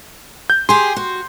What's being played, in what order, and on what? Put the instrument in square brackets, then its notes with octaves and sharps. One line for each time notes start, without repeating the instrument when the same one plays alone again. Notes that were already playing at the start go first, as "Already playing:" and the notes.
[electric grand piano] G6
[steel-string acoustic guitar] G4 G#4 [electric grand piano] C6
[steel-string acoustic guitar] F#4